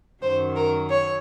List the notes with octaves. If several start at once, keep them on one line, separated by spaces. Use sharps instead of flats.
F#2 D#3 F#3 C5
A#4
C#5